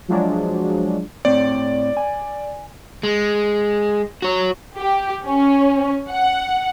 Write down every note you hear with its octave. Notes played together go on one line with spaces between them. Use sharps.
F3 F#3 G#3 D4
A2 C4 C#5 D5
G#5
G#3
F#4 C#5
G4
C#4
F#5